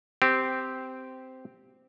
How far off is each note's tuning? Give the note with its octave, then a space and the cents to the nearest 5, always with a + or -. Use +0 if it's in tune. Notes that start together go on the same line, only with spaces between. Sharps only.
C4 -10 G4 +0